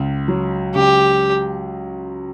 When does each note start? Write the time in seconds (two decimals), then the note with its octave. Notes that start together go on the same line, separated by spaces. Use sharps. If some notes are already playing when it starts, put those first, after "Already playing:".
Already playing: C#2
0.28 F#3
0.75 C#2 G4